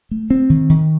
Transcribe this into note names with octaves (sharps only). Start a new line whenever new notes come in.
A3
C4
D#3
D#3